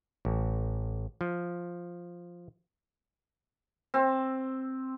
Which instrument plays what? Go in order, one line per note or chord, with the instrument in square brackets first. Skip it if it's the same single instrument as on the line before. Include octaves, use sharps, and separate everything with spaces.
[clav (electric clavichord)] A1
F3
[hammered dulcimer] C4